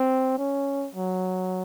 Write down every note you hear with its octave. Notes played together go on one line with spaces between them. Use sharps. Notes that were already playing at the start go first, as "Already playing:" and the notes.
Already playing: C4
C#4
F#3